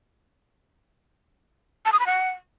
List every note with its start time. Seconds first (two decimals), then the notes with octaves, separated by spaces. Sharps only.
1.85 A5
1.92 D#6
2.00 B5
2.07 F#5